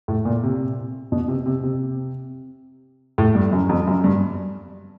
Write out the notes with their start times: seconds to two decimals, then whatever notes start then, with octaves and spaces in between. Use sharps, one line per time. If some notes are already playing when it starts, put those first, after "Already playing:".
0.08 A2
0.25 A#2
0.43 C3
1.12 B2
1.28 C3
1.46 C3
1.63 C3
3.18 A2
3.35 G2
3.53 F#2
3.69 F2
3.87 F#2
4.04 G2